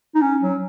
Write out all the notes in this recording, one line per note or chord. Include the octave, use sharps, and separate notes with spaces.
D#4
C#4
F#3